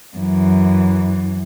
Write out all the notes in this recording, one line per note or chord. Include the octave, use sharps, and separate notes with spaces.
F#2 E3